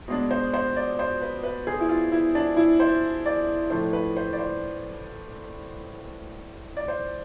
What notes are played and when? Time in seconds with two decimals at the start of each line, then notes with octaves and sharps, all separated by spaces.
0.08 B2 G#3 D4
0.31 C5
0.54 C5
0.77 D5
0.99 C5
1.22 B4
1.43 B4
1.67 G#4
1.81 E4
1.89 F4
2.12 E4
2.35 D4
2.57 E4
2.80 C5
3.26 D5
3.70 A2 F3 A3 D4 C5
3.93 B4
4.17 C5
4.33 D5
4.39 C5
6.77 D5
6.88 C5